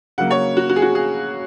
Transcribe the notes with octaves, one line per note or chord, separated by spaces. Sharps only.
C#3 F#3 A#3 F#5
C#5
F#4
F#4
G#4
F#4
G#4